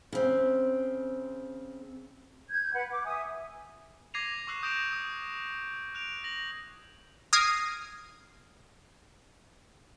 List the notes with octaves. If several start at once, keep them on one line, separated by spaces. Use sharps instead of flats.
C#3 C4
G6 G#6
B4 F#5
D6
E5 G#5 D#6
D6 G#6 A#6 C7 D#7 F7
C#6 D6 E6 F#6 C7
D#6 G6 A#6 D7 E7 F7
D#6
F#6 D7 F7
A#6 F7 F#7
D#6 F6 G#6 A#6 C7 D7